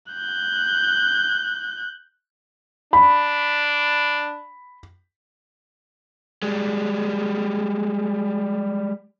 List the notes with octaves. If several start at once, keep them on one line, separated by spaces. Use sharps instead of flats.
F#6 G6
D4 B5
G3 G#3